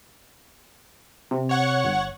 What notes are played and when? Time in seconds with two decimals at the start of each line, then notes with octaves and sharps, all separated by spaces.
1.31 C3
1.49 C#5 F#5 C#6
1.85 G1